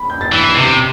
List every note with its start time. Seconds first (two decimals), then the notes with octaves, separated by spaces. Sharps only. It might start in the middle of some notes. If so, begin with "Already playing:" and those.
Already playing: B5
0.10 G6
0.21 A6
0.32 E3 B6
0.44 C7
0.55 C3 C7
0.71 D7